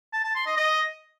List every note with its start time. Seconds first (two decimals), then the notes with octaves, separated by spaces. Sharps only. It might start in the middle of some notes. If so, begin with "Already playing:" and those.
0.13 A5
0.24 A5
0.35 C6
0.46 D#5
0.57 D#5